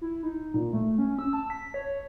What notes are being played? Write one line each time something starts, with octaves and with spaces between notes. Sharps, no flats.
E4
D#4
A#2
A3
C#4
E6
A5
B6
C#5